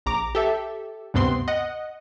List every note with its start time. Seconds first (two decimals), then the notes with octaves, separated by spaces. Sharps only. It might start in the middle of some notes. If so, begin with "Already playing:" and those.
0.06 A#1 A#5 D6
0.35 G4 A4 E5
1.14 D2 G2 C3 B3 C4 C6
1.48 D#5 F#5